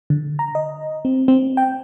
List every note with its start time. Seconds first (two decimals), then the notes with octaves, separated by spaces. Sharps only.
0.10 D3
0.39 A#5
0.55 D#5
1.05 C4
1.28 C4
1.57 G5